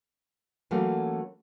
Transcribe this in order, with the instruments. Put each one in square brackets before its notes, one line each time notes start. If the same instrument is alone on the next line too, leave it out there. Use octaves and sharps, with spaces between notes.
[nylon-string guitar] E3 F#3 A3 A#3 C#4 F4